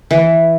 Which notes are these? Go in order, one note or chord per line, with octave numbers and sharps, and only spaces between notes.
E3